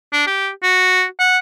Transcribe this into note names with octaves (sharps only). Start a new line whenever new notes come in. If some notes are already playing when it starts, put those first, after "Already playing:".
D4
G4
F#4
F#5